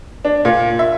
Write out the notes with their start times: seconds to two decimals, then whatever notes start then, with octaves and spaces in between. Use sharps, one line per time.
0.25 D4
0.45 A#2
0.79 E5